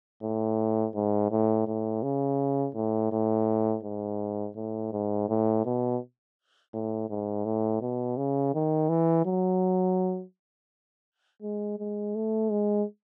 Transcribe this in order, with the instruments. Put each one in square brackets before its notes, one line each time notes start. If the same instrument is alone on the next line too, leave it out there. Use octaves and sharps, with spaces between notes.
[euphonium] A2
G#2
A2
A2
C#3
A2
A2
G#2
A2
G#2
A2
B2
A2
G#2
A2
B2
C#3
D#3
E3
F#3
G#3
G#3
A3
G#3